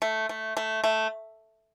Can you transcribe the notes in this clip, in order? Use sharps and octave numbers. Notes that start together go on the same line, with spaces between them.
A3
A3
A3
A3